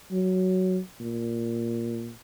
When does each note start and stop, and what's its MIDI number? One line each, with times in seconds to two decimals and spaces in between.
0.12 0.79 54
1.00 2.10 46